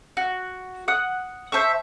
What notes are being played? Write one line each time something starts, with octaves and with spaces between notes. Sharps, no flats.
F#4
F#5 D#6 F#6
C5 E5 A5 C#6